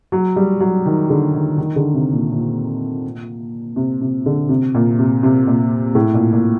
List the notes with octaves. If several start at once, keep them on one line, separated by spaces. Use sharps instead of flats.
F#3
G3
F#3
D#3
D3
D#3
D#3
D3
C3
A#2
A#2
C3
C3
D3
C3
A#2
C3
C3
A#2
A2
A#2
A#2